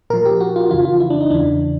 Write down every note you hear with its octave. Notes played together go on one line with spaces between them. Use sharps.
A#2 F3 A#4
G4
F#4
F4
F2 C#3 E3 F4
F4
E4
D4
D#4
E2 C#3 E3 D4